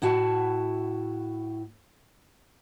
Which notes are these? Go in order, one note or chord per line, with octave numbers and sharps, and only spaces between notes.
A2 E4 F#4 A5